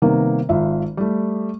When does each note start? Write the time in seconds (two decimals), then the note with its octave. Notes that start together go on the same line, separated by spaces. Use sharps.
0.02 C3 D#3 G3 A#3 B3
0.49 G#1 F4 E5
0.97 G3 A3